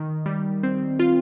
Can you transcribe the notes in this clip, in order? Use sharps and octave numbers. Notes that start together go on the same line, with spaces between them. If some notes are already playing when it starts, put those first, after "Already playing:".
Already playing: D#3
G3
C4
F4